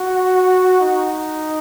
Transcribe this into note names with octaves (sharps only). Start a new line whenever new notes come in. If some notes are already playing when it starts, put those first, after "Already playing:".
Already playing: F#4
D#4